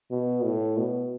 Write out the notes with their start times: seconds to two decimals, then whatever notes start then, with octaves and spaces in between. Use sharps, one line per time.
0.11 B2
0.44 A2
0.78 B2